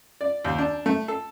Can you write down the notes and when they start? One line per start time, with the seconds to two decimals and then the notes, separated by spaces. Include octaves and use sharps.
0.21 D5
0.44 D#2
0.58 D4
0.86 A3
1.08 A4